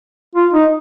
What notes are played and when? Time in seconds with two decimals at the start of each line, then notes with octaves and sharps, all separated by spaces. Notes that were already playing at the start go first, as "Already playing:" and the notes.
0.36 F4
0.53 D#4